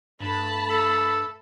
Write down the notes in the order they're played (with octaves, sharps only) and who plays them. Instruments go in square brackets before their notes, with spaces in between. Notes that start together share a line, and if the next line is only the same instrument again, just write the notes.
[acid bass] G2 [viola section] A3 A5 B5
[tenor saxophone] A4